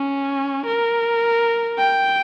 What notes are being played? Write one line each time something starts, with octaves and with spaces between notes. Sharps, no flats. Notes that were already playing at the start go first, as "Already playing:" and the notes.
Already playing: C#4
A#4
G5